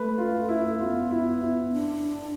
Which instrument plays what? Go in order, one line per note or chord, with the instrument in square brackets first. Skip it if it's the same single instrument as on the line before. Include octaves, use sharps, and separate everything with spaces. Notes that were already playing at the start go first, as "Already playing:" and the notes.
Already playing: [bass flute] A3 [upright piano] B4
[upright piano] F4
E4
[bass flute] B3 [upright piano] F4
[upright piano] E4
E4
[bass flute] D4